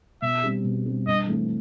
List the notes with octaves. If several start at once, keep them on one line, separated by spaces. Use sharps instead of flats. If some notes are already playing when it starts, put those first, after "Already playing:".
B2 E5
G3 C4
B2
G3 C4
G2 D#5
E3 A3 C4